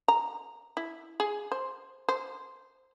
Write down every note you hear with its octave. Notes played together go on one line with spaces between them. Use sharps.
A#5
E4
G#4
C5
C5